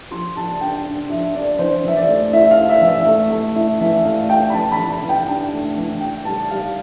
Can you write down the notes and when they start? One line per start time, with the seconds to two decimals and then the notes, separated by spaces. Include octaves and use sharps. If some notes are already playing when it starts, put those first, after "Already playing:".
0.11 F3 C6
0.36 F3 A5
0.61 D4 G5
0.85 D4
1.09 F3 E5
1.34 D4 D5
1.59 E3 C5
1.84 E3 E5
1.96 D5
2.08 A3
2.33 E4 E5
2.51 F5
2.58 E4
2.69 E5
2.82 E3
2.88 E5
3.06 A3
3.30 A3
3.56 E4
3.80 E3 E5
4.04 A3 F5
4.29 E4 G5
4.50 B5
4.54 E3 A5
4.72 B5
4.78 E3
4.90 B5
5.03 E3
5.09 G5
5.27 D4 G5
5.52 A3
5.77 E3
6.01 E4 G5
6.25 G3 A5
6.50 G3 F5